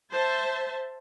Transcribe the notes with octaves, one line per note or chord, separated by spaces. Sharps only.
C5 E5 A5